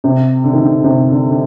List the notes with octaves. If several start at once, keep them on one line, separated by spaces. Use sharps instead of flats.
C3
D3
D#3
D3
C3
D3
D3